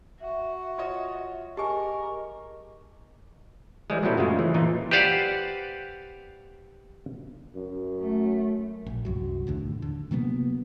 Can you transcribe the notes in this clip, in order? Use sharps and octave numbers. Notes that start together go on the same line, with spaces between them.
F#4 E5
F4 C#5 D#5
G4 G#4 A#4 D#5 G#5 A5 C#6 D6
E3 G3 G#3
A#2 F#3 G3 C4 E4 A4
F#2 C#3 G#3 A3 F4
E3
A#2 E3 D#4 F4
G4 B4 C5 D5 F5 F#5
F#2
A3
A#1
C2 F#2 F#3
D#2 A2 D3
D3
C3 F#3 A#3 B3